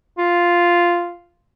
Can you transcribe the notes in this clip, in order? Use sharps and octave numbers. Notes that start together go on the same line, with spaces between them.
F4